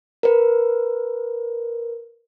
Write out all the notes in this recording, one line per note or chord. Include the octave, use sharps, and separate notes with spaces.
A#4 B4